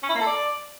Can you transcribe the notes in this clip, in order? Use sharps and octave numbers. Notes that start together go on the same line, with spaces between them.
C#4
E4
A#3
A4
D5